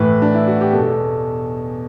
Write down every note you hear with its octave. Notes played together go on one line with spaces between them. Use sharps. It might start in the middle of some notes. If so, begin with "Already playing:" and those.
Already playing: A2 E3 B4
D4
E4
F#4
G4
E2 B2 A4